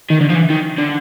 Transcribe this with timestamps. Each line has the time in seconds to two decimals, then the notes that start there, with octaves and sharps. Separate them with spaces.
0.10 D#3
0.21 D3
0.30 F3
0.35 E3
0.50 D#3
0.78 D3